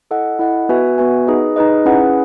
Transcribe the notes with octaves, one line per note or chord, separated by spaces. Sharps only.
E4 A4 D#5 F#5
E4 A4 D#5 F#5
B3 F#4 B4 E5 G#5
B3 F#4 B4 E5 G#5
D#4 G#4 B4 D#5
D#4 G#4 B4 D#5
C#4 E4 G#4 B4 F#5